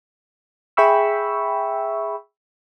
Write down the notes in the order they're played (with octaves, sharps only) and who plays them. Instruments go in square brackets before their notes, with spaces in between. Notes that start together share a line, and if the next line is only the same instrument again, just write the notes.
[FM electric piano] G#4 E5 G5 B5 C#6 E6